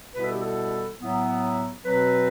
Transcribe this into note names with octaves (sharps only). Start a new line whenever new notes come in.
B2 G3 B3 E4 B4
A4
G4
A4
A2 F#3 B3 E4
B2 F#3 C4 B4